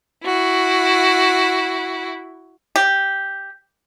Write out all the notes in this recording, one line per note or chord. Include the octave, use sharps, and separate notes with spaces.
E4 F#4
G4